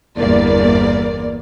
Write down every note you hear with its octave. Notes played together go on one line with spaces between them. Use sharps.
G1 E2 A#3 D5